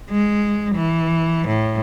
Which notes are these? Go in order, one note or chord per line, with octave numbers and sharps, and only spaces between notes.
G#3
E3
A2